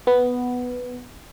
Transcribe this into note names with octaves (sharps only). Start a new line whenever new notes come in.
B3